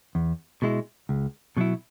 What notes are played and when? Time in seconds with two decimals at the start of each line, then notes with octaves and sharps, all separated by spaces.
0.15 E2
0.62 B2 G#3 E4
1.09 C#2
1.57 B2 F#3 E4